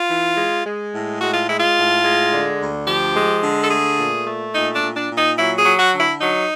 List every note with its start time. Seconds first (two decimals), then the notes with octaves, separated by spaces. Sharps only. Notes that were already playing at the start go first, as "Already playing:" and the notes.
Already playing: F4
0.10 E3
0.37 G#3
0.66 G#3
0.93 A2
1.21 G#3 F#4
1.34 F4
1.48 G#3 E4
1.60 F4
1.76 A2
2.04 G#3
2.32 D3
2.60 D2
2.87 F3 G4
3.15 G#3
3.43 D3
3.64 A4
3.71 A3 G#4
3.99 A#2
4.27 A3
4.55 A#2 D#4
4.75 D4
4.82 A#2
4.96 D4
5.10 A#2
5.18 D#4
5.38 F#3 E4
5.58 G#4
5.65 F#3
5.79 F#4
5.93 D3
6.00 E4
6.21 F#3 D#4